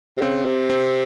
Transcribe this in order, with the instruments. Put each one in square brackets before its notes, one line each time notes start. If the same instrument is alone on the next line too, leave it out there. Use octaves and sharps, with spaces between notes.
[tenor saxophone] C3
[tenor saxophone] C#3 [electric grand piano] C4
[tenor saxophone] C3
[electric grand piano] C4